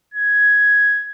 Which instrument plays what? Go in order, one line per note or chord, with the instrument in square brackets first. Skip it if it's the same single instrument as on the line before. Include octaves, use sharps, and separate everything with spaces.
[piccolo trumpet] G#6